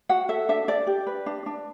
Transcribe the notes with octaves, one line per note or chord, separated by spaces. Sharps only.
F#4 F#5
A4 E5
D4 E5
D4 D5
G4
B4
D4
D4